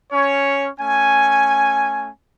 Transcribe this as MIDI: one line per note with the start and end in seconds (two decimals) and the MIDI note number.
0.12 0.68 61
0.12 0.68 73
0.79 2.10 57
0.79 2.10 61
0.79 2.10 80